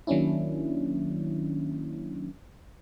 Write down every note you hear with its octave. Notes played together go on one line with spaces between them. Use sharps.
D#3 F#3 A#3 C#4 D4 E4